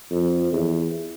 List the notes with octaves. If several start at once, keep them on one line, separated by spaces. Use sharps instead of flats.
F2
E2